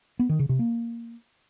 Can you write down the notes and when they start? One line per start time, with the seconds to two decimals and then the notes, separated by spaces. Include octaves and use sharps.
0.19 B3
0.29 D#3
0.39 C#3
0.49 C3
0.59 A#3